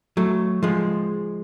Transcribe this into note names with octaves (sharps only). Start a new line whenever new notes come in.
F#3 A3
F3 G#3